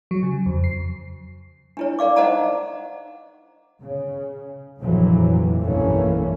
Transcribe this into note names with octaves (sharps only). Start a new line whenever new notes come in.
F#3
C#3
F2
C7
D4 E4 C#5
A#4 D5 F5 D6
D#4 C5 D#5 F#5 A5 A#5
C#3
A#1 F2 C3 E3 F#3
B1 G2 E3 A3 A#3 C#4